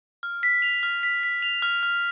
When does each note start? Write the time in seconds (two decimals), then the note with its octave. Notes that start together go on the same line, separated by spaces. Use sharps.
0.23 F6
0.43 B6
0.62 F7
0.83 F6
1.03 B6
1.23 B6
1.42 F7
1.62 F6
1.83 F6